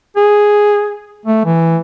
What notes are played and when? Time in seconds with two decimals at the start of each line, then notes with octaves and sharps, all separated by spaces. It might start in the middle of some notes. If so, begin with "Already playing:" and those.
0.16 G#4
1.26 A3
1.45 E3